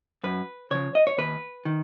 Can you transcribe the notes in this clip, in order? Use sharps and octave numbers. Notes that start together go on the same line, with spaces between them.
F#2 B4
C#3 F3 C#5
D#5
C#5
D#2 B4
D#3